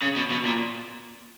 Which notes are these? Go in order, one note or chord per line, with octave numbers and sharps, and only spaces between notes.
C#3
B2
B2
A#2